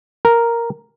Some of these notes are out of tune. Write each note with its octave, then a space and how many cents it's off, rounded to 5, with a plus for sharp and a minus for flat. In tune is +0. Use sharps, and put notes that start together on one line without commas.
A#4 +0